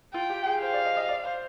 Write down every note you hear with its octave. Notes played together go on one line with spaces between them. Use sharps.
F4 G5
G4
G#4
C5 F5
D5
D#5
D#5
D5
C5